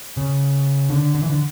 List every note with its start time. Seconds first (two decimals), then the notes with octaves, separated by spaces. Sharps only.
0.17 C#3
0.90 D3
1.15 D3
1.22 E3
1.30 D3